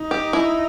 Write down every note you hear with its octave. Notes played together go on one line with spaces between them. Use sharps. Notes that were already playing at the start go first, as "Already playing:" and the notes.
Already playing: D#4
G4
E4